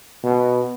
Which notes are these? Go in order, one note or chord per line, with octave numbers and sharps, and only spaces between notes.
B2